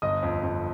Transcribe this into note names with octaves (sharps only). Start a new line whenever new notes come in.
G1 D#5 D#6
F2
F2